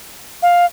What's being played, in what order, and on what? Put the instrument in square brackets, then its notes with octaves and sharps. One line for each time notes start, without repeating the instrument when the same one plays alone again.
[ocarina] F5